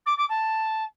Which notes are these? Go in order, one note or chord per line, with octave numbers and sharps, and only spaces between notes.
D6
D6
A5